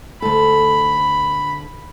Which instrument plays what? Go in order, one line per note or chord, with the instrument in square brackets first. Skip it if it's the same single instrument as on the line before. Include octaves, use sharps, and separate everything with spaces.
[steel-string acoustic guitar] D2 A4 [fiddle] B5